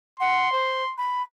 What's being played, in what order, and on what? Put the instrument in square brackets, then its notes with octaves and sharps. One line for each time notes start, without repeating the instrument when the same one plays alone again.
[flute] F#5 [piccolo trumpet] C6
[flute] C5
B5